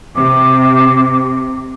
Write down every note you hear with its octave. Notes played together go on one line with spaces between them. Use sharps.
C3 D6